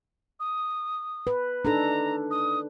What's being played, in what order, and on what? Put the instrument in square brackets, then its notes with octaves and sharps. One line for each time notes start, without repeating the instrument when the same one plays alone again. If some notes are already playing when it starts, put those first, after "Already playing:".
[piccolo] D#6
[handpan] B4
[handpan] D4 D#4 A4 [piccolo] A#5
[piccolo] D#6